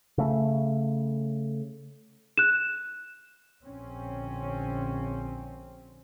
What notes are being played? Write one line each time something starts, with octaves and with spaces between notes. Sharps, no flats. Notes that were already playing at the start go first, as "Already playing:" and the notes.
C#3 A3
F#6 E7
A#1 D3 C4 C#4